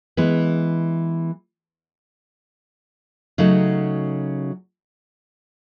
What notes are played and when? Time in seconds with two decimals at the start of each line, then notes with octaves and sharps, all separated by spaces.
0.17 E3 G#3 B3
3.38 C#3 F#3 A3 D#4 F#4